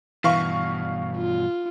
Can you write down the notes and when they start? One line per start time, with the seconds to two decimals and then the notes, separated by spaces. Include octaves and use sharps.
0.24 G2 B2 E3 F5 C#6
1.17 F4